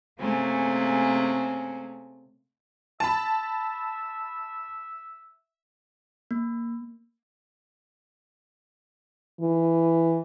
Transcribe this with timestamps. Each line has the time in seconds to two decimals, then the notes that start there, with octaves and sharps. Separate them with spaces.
0.20 C3 A3 A#3 C4 C#4 G#4
3.00 E5 A5 B5
6.31 A#3
9.41 E3